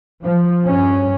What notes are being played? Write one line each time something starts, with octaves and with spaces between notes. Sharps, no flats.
F3
G2 C#4